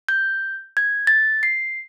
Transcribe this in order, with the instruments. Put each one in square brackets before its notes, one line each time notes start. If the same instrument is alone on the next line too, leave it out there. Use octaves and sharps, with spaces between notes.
[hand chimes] G6
G#6
A6
C7